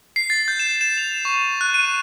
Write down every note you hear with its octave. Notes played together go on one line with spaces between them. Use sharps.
C7
A6
G6
E7
E7
F7
C#6
F#6
D#7